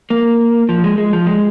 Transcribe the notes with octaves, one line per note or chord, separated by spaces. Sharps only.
A#3
F3
G#3
G#3
F3
G#3